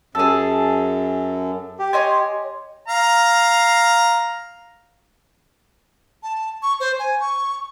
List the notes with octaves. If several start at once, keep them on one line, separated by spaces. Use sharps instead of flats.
F#2 G#4 A4
G4
C#5 D#5 G#5 C6
F5 A#5
A5
C#6
C5
G#5
C#6